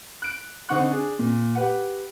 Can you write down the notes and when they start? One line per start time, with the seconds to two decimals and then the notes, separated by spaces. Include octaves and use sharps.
0.22 F#6 D7
0.69 D3 C4 D#4 F#5 C#6 F#6
0.91 D4 G#4
1.19 A#2
1.55 G4 B4 F#5